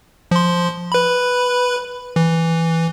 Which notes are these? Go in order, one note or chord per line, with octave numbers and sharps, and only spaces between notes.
F3 C6
B4 B5
E3